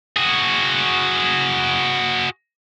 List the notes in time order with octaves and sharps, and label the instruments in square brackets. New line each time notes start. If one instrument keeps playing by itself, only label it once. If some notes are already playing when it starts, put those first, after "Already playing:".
[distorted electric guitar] F#4 G#4